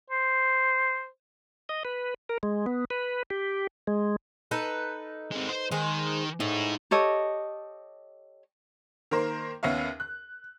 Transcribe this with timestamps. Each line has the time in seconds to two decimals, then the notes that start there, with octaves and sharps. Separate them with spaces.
0.10 C5
1.69 D#5
1.85 B4
2.29 A#4
2.43 G#3
2.66 B3
2.90 B4
3.30 G4
3.87 G#3
4.51 D#4 A4 B4
5.32 G#3 C4
5.49 C5
5.72 D#3 G#3 C5
6.40 A2 D#4 G#4
6.91 G4 A4 C#5 D#5
9.11 D#3 A#3 A#4 C5
9.63 D#2 B3 C#4 E5 F5
10.00 F#6